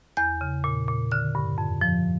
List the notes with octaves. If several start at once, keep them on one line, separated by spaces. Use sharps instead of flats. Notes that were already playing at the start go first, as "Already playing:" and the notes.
E2 G6
C#3
A#2
A#2
D3 F6
G2
F2
F3